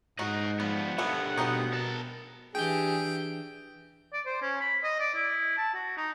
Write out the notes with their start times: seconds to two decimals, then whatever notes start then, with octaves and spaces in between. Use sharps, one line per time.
0.19 G#2 D#4 F#4 D#5 F#5
0.60 F3 G3 B3 F#5
0.98 G2 A3 B3 E4
1.38 B2 B3 C4 D#4
1.73 A#4 A5
2.55 E3 D4 G4 G#4 G5 G6
4.13 D5
4.26 C5
4.42 C#4
4.61 B5
4.83 D#5
5.00 D5
5.14 E4
5.58 A5
5.74 F#4
5.97 D#4